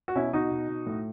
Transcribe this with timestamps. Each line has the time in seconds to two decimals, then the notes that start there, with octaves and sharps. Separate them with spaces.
0.08 F#4
0.15 B2 C#4 E4
0.33 B2 D#4 F#4
0.51 B2
0.69 B2
0.86 A2